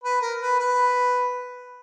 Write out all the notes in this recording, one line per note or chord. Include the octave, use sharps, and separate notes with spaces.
B4
A#4
B4
B4